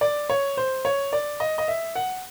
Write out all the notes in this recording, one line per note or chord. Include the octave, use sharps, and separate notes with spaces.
D5
C#5
C5
C#5
D5
D#5
D#5
E5
F#5